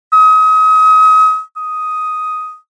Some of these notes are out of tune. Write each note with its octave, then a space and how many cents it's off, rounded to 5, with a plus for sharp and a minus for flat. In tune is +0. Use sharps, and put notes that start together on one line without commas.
D#6 +35
D#6 +5